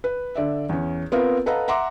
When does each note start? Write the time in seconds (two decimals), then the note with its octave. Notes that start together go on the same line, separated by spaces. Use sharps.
0.04 B4
0.35 D3 D5 E5
0.69 E2 C#4
1.12 B3 C4 F4 A#4
1.46 A4 B4 D#5 F5 F#5 A#5
1.68 E5 F#5 A#5 C6 D6